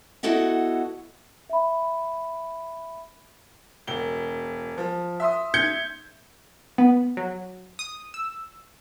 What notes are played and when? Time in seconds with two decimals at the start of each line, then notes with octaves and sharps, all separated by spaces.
0.23 B3 E4 F#4 A4 D#5 F#5
1.50 E5 B5
3.87 E1 G7
4.78 F3
5.20 E5 C6 D#6
5.54 G6 G#6 C#7
6.78 B3
7.17 F#3
7.79 D#6
8.14 E6